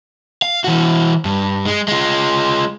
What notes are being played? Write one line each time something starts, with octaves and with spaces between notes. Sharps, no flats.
F5
E3 F#4
G2
G#3
G#3 F4